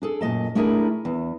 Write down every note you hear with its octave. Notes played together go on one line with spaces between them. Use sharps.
D4 G#4 A4
F#2 A#2 F#3 D#5 A5
A3 D4 E4 G#4 A#4
E2